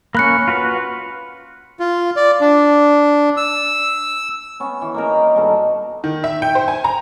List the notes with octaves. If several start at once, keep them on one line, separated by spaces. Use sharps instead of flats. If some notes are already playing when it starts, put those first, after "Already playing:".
A#3 C#4 B5 F#6 C#7
F4 F#4 B4
F4
D5
D4
E6
B3 C#4
E3
A#3 D#4 A#4
F5
G2 B2 F#4 A4
D#3
E5
G5
C5
G#5
A#5